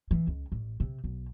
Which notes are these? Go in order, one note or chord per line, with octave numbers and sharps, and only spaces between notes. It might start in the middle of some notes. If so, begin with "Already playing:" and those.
E3
C#2
A1
C3
B1